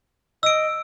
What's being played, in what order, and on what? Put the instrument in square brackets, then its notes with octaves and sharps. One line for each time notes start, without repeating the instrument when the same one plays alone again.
[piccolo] D#5 [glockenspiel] E6 D7